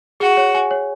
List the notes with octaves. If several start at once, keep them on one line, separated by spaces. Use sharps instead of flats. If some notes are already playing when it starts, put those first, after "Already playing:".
F#4 G#4
C#5
G#5
C#5